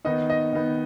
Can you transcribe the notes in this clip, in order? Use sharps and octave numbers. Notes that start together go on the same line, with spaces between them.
D#3 B3 D#4 D#5
D#5
D#3 B3 D#4